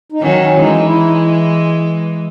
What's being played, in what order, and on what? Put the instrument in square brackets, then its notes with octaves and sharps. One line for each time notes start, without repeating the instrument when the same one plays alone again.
[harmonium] D#4
[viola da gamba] D#3 F#3 [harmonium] C#4
[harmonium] C#4
[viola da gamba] E3 G#3 [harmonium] D#4
[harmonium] E4